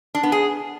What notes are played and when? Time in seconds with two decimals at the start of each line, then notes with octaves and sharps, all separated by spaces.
0.15 D4
0.23 B3
0.32 G#4